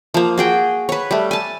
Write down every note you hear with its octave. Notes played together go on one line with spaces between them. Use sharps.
F3 A#3
F#4 G#4 G5
B4 C#5
G3 A3
G#5 A5